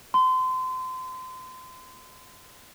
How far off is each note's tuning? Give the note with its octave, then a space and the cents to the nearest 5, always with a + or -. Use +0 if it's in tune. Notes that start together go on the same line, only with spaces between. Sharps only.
C6 -30